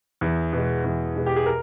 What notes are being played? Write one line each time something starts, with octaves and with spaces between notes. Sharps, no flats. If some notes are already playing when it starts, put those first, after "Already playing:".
E2
B2 G#3
E2
B2 G#3
G4
G#4
A#4